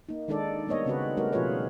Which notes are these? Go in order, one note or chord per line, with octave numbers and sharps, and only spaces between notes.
A#3 D#4
D#3 G#3 D4 D#4 A4 D5
G3 A#3 B3 C#5 D#5
C#3 C4 C#4 F#4 B4
G3 A3 D#4 F#4 A#4
B2 F3 F4 G#4 B4 C#5